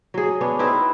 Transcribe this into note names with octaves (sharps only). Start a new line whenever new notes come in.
F#3 G#4
B3 C#4 D4
C4 D#4 E4 B4